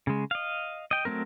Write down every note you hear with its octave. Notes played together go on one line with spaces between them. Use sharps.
C#3 G#3
D#5 F5
D#5 G5
F#3 A3 C4 A#4